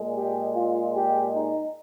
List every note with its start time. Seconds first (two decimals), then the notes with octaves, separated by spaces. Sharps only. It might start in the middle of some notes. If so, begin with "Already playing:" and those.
Already playing: A#2 G#3
0.16 G4
0.55 F4
0.95 G4
1.35 D#4